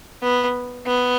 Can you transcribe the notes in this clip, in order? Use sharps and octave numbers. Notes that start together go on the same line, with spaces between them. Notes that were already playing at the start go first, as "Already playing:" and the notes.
B3
B3